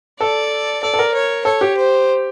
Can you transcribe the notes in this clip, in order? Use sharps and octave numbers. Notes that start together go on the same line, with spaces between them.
A4 D5
A4 D5
A4
A#4
C#5
A4 C#5
G4
C5